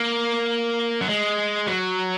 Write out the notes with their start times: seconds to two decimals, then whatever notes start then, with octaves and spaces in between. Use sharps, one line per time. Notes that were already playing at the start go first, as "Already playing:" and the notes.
Already playing: A#3
1.01 F#3
1.08 G#3
1.67 F#3